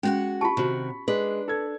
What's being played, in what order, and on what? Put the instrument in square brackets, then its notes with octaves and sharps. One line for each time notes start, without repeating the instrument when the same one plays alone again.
[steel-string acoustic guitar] G#3 F#4 F#5 [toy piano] C#4
[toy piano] F4 G4 A5 [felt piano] B5 C#6
[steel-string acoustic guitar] C3 [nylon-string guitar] D#3 F#4
[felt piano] G#3 [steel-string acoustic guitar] D4 [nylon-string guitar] B4
[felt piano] A4 G#6